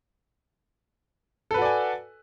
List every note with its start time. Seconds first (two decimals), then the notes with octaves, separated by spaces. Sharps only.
1.51 A4
1.54 B4
1.58 F#4
1.62 D5
1.65 G#5